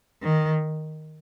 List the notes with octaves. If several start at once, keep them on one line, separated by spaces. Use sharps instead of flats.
D#3